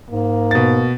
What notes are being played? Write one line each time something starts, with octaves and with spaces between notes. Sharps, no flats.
G#2 A#3
B2 A6